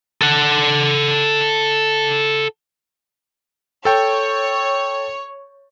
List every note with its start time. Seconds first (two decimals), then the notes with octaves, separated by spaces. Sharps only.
0.22 A4 F#5
3.85 A4 C#5 G5